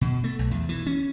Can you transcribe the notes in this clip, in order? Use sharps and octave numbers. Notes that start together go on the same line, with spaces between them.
B2
A3
B1
E2
E3
C#4